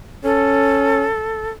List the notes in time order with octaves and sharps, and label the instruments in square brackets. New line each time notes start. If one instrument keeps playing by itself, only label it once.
[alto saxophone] C#4 [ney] A4